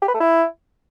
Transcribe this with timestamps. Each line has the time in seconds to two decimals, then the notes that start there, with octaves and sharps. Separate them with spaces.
0.02 G4
0.08 B4
0.14 A3
0.20 E4